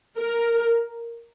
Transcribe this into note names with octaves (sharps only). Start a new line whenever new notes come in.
A#4